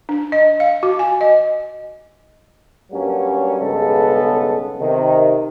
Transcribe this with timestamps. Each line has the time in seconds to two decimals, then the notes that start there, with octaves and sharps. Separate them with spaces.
0.09 D4
0.32 D#5
0.60 F5
0.83 F#4
0.99 G#5
1.21 D#5
2.92 G2 F#3 G3 A#3 C#4
3.61 B1 G2 C#3 G#3 B3 A4
4.79 C3 D#3